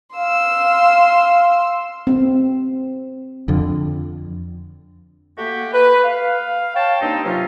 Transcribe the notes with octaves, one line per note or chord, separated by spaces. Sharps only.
F5 C6 E6
C4
F2 D3
A3 A#3 F#4 G4 F#5
B4
F5
C#5 F5 G5 A5
G2 A#3 C4 D#4
C3 F#3 C#4 F4